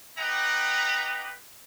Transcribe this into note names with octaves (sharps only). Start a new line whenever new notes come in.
D#4 G4 B4 F#5 G5 A#5